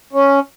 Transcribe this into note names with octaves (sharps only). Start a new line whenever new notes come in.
C#4